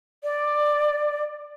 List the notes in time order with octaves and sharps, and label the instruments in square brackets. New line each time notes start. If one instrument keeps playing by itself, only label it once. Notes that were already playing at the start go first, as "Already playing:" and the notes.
[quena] D5